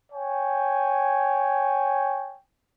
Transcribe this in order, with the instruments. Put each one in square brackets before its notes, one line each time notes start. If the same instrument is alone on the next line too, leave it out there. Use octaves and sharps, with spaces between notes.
[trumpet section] C#5 G5 G#5